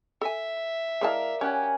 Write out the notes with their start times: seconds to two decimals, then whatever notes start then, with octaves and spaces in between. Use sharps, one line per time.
0.21 A4 E5 G#5
1.01 G#3 E4 A#4 D5 F5 A5
1.41 C#4 G4 C#5 F#5 G#5